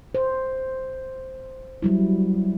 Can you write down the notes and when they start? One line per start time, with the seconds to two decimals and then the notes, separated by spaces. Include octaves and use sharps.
0.15 C5
1.82 F#3 G3 E4